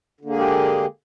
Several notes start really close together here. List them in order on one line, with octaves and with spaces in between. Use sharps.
D3 A#3 G#4 G#3 G4